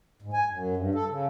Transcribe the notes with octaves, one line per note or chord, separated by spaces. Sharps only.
G#2
G#5
F#2
G2
A4
C#3